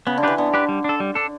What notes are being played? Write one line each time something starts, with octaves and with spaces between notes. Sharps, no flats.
C#3 B3
D3
E3 D4 G4 B4
D3 B3
D4 G4 B4
G3
D4 A4
G3
D4 A4